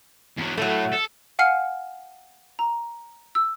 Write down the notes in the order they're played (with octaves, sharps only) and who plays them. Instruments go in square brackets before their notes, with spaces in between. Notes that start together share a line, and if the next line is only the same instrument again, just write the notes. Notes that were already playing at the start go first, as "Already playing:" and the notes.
[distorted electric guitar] E2 F#3
[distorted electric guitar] A2 [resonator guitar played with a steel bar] F#3 A3
[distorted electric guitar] A4
[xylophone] F5 F#5 G#5 F6 C7 C#7
A#5
E6